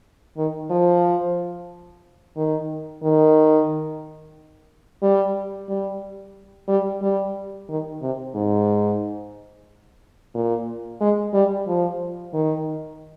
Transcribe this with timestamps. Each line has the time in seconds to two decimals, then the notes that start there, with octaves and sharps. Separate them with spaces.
0.37 D#3
0.70 F3
2.36 D#3
3.03 D#3
5.03 G3
5.69 G3
6.68 G3
7.02 G3
7.69 D#3
8.02 C3
8.35 G#2
10.35 A#2
11.01 G#3
11.34 G3
11.68 F3
12.34 D#3